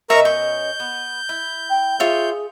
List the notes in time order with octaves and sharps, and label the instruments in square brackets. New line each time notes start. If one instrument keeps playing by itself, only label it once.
[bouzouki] B2 C#4 D#5 [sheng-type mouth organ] A#4 A#5 C#6 [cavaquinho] E5
[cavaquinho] C#6 [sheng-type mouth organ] G6
[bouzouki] B3
E4
[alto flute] G5
[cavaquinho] F4 C#5 E5 [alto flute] G#4